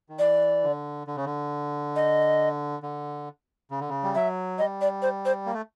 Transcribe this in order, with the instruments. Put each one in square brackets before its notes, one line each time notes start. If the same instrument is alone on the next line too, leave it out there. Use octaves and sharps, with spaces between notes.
[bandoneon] D#3
[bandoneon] E3 [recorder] D5
[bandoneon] D3
D3
C#3
D3
[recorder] D#5
[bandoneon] D3
C#3
D3
C#3
G3
[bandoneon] F#3 [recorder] E5
[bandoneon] G3 [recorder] D#5
[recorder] D5
C5
C5
[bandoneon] A#3
A3